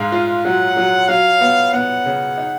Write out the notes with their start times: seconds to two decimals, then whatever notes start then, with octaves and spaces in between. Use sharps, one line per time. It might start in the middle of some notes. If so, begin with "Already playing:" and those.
Already playing: G#2 G#3 F5
0.12 F4
0.45 F#3 F#5
0.77 F#3
1.09 F#3 F5
1.41 B3
1.73 B3 F#5
2.06 C#3
2.38 D#4